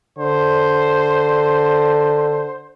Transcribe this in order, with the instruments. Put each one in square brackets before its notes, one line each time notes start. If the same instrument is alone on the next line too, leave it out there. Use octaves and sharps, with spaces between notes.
[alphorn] D3 [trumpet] C5